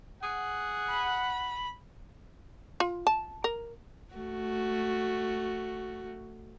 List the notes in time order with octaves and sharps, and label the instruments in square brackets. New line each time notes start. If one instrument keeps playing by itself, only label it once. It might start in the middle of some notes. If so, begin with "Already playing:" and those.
[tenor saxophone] G#4 [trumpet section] F#5
[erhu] B5
[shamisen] F4
A5
A#4
[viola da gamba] A3 F#4